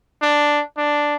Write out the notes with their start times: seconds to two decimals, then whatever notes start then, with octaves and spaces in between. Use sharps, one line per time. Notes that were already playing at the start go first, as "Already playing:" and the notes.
0.22 D4
0.78 D4